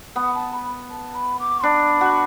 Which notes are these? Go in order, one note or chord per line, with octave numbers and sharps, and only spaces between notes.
B3 F#5
A5
B5
A5
B5
D6
D4 B5
F#4